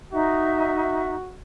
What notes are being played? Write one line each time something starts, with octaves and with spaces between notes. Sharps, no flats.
D#4 F#4 E5